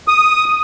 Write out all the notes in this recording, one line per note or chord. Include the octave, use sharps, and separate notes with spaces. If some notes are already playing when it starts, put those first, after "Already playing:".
D#6